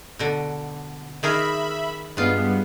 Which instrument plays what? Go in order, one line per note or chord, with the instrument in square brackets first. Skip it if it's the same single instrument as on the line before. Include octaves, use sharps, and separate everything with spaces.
[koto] B2 D3
[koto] D#3 G#4 A#4 [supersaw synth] E5 B5
[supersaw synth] G2 B3 [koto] G#3 F4